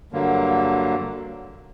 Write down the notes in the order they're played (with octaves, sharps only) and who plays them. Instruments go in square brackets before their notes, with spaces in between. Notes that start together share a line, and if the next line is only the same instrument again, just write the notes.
[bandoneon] G2 D3 F#3 A#3